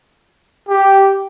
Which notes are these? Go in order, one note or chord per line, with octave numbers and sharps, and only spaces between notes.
G4